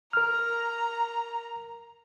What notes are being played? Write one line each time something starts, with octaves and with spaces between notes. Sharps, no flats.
A#4 A#5 F6